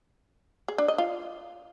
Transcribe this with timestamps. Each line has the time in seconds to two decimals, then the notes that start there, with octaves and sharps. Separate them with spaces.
0.68 G#4
0.78 D4
0.88 D#5
0.98 F4